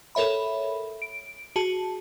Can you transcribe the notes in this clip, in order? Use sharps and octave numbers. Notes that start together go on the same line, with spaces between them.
A4 A#4 C#5 E5 B5
D7
F#4 G#4 A5